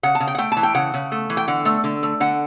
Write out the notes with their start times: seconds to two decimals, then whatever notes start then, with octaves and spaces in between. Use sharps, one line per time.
0.03 C#3 F#5
0.15 A5
0.20 C#3
0.27 G5
0.35 F#5
0.38 A3 G5
0.52 E3 A5
0.63 G5
0.75 C#3 F#5
0.94 C#3
1.12 A3
1.30 E3
1.37 G5
1.48 D3 F#5
1.65 A3
1.84 D3
2.03 A3
2.20 D3 F#5